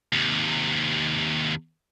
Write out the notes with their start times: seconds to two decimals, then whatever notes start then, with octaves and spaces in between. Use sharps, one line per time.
0.13 D#2 C3